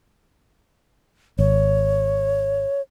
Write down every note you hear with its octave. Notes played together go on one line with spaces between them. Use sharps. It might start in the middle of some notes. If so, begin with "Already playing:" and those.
G#1 C#5